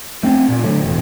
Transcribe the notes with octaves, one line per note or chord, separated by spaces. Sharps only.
A3 C4
A#2
D3 F#3 A3
E1 A1